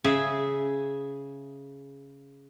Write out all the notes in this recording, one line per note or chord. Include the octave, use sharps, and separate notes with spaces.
C#3 G#4 E5